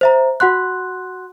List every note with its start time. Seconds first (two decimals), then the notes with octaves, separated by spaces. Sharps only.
0.01 C5 E5 A#5
0.40 F#4 F#5 C6 F#6